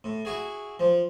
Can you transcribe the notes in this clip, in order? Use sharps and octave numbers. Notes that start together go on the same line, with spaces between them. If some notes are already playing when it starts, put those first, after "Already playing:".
A2
E4 F#4 G#4
F3